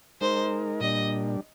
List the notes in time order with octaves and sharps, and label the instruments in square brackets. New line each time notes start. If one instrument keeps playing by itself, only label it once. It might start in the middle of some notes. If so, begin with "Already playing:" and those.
[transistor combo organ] G#3 D#4 A#4 [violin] C5
[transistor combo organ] A#2 G3 D4 [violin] D#5